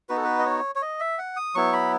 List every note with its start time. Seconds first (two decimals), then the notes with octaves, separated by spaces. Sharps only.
0.09 B3 D#4 F#4 B4
0.17 A4
0.24 B4
0.39 D#5
0.46 C#5
0.75 C#5
0.82 D#5
1.00 E5
1.18 F#5
1.36 D#6
1.55 F#3 B3 E4 C#6
1.73 B5